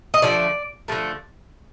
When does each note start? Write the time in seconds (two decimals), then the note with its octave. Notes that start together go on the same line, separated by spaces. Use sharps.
0.14 D#5
0.22 D3 F3 A3 D5
0.88 D3 F3 A3